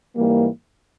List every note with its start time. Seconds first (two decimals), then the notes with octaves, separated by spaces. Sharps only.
0.15 G#2 E3 G3 A#3